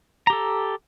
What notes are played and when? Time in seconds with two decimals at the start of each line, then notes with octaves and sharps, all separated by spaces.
0.27 A#5
0.30 G4
0.33 A4